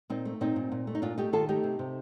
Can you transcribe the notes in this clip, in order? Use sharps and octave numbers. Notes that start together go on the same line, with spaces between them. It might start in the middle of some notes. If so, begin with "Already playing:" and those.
A#2 C4 D#4
A3
A#2 C4 D#4
A#2
A#2
A3
D#4
A#2 D4 F4
A3 D#4 G4
D#3 F4 A4
A3 D#4 G4
C3
C3